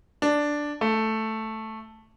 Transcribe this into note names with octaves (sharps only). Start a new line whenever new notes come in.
D4
A3